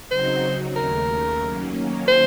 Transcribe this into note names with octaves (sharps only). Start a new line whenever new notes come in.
C#3 F#3 C4 D#4 F#4 C5
D#2 C#3 A3 A#4
D#3 F#3 A#3 C#4
C5